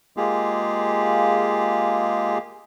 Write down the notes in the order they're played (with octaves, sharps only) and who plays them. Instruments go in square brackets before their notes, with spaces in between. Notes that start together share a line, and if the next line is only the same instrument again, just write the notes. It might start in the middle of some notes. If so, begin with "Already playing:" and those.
[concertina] G#3 A#3 F4 G4 G#4